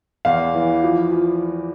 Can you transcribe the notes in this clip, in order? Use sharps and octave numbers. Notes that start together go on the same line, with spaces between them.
E2 F5
E3
F3
F3